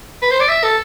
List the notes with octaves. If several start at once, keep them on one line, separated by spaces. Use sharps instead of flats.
B4
C5
D5
E5
A4